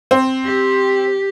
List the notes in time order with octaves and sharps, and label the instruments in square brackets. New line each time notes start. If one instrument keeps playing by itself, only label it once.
[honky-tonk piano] C4
[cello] G4